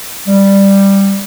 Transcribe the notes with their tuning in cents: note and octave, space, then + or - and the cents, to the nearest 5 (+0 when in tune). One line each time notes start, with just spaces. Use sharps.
G3 +5